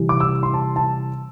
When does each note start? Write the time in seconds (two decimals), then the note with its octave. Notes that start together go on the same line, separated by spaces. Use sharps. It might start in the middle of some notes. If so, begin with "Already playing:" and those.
Already playing: C3 E3 G3
0.09 D6
0.20 E6
0.43 C6
0.54 A5
0.76 A5